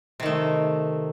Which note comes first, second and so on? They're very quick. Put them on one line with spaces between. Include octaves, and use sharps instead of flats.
C3 D#3 A3